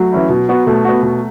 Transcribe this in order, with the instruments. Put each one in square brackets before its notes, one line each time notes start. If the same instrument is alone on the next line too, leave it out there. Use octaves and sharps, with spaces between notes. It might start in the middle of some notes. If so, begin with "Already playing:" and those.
Already playing: [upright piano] F#3 A3
[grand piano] E3 C#4 E4
B2
B3 F#4
[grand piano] B2 [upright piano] A3
[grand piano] B3 F#4
B2